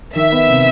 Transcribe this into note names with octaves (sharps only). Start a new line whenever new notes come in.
D#3 E5
B3
C3